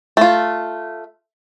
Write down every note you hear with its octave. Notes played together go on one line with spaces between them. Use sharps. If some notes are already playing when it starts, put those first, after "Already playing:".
A3 F4